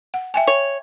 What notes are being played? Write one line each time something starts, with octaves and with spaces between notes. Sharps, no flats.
F#5
E5 G5 G#5
C#5